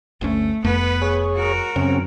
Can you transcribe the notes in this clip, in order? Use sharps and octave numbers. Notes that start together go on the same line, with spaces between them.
G1 D2 A3 C#4
F1 F2 A3 B3 B4
G#4 C#5
F#4 A#4
F#2 C#3 C4 C#4